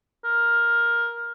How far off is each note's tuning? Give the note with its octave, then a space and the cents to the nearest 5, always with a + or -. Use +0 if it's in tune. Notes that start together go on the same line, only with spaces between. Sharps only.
A#4 +10